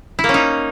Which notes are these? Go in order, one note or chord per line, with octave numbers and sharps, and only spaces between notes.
E4
A#3
C#4
D#4